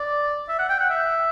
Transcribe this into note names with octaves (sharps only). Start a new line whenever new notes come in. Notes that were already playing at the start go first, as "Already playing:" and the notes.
Already playing: D5
E5
F#5
G5
F#5
E5